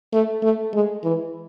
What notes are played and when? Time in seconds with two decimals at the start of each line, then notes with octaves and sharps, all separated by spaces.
0.12 A3
0.43 A3
0.73 G#3
1.04 E3